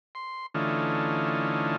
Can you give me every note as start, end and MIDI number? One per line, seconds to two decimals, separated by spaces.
0.15 0.46 84
0.54 1.76 50
0.54 1.76 52
0.54 1.76 57
0.54 1.76 61
0.54 1.76 63
0.54 1.76 65